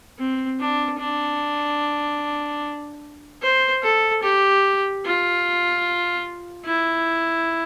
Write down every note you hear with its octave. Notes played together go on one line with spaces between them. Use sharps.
C4
D4
D4
C5
A4
G4
F4
E4